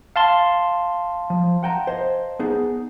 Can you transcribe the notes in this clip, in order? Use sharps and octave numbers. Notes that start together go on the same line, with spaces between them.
F5 A5 C6
F3
F#5 G5 A#5
C5 D#5
B3 D#4 G#4